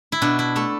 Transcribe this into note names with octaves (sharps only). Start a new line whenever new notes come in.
E4
B2 D4
E4
A3 A4